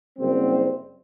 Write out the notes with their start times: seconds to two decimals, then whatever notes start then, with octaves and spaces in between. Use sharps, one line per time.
0.18 F#1 G3 C4